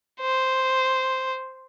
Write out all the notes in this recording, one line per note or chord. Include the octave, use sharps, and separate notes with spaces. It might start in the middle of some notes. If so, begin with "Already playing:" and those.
C5